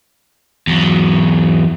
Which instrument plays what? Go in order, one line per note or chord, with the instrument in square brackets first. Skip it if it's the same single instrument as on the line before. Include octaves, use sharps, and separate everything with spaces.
[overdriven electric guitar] E2 F#3